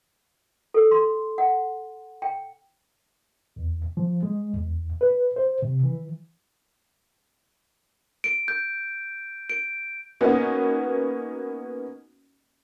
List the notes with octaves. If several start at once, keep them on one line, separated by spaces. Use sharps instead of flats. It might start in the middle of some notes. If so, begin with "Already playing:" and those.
A4
C6
F#5
G5
E2
F3
G#3
E2
B4
C5
C3
E3
D7
G6
D7
A#3 B3 C#4 D#4 F#4